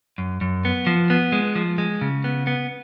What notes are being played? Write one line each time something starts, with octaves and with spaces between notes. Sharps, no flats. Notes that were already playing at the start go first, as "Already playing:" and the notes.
F#2
F#2
B3
F3
B3
G#3
F3
G#3
C#3
B3
B3